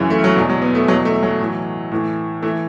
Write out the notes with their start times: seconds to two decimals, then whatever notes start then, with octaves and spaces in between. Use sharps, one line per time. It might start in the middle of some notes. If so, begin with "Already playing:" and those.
Already playing: F#2 C#3 E3
0.10 A3
0.24 F#3
0.36 E2 B2
0.50 F#3
0.62 B3
0.75 A3
0.88 E2 B2 F#3
1.05 A3
1.23 F#3
1.40 A2 E3
1.91 A2 E3
2.43 E3 A3